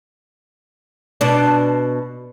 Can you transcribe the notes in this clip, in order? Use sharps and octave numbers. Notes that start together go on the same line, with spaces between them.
B2 D4